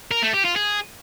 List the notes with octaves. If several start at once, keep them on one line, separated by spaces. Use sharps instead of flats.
A#4
A3
G4
F4
G#4